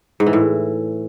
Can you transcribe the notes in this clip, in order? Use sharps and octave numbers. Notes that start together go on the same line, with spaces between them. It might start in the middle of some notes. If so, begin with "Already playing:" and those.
G#2
E3
A2